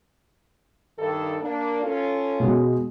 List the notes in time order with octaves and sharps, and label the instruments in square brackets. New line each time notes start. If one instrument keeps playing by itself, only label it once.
[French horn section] G2 D#3 A4
A#3 D4
C#4 F4 A4
[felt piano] B2 G#3 F#4